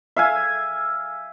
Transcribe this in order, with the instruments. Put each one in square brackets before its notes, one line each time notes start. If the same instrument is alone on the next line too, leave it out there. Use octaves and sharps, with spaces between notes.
[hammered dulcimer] E5 F5 G#5